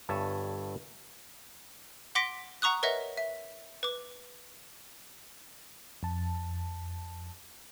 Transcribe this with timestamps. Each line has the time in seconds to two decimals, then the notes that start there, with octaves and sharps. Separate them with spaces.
0.09 G1 G2 C#5 E5 G#5 A5
2.15 F#5 C6 D6 A#6 B6 D7
2.62 F#5 A#5 C#6 D#6 F#6
2.83 A#4 B4 C#5 D#5 E5 F#5
3.17 E5
3.83 B4 D6
6.03 F2 A5